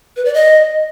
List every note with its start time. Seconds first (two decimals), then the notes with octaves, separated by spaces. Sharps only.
0.16 B4
0.25 D5
0.34 D#5